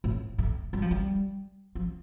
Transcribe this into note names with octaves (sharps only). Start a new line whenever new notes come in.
A2
A2
G3
F3
G3
F3